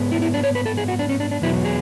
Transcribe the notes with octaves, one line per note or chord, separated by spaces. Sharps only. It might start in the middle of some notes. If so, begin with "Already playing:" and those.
Already playing: G#2 G#3 B3
E4
E4
D4
C#5
B4
A4
G#4
F#4
D4
C#4
D4
D4
E2 B2 F#3 B3 E4
G#4